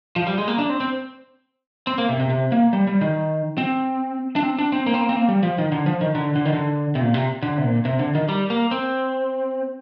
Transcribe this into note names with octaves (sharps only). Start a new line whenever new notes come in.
F3
G3
G#3
A#3
D4
C4
C4
C4
A#3
C3
C3
C3
A#3
G3
G3
D#3
C4
D4
C4
D4
C4
A#3
C4
A#3
C4
A#3
G3
F3
D#3
D3
F3
D#3
D3
D3
D#3
D3
C3
A#2
C3
D3
C3
A#2
C3
D3
D#3
G3
A#3
C4